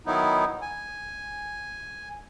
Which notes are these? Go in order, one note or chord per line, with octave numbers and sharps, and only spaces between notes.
D#3 F#3 B3 D#4 E4
G#5